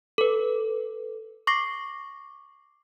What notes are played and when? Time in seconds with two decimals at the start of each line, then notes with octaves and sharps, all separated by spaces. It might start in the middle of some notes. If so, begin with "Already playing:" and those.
0.18 A4 B4
1.47 C#6 D6 A#6 C7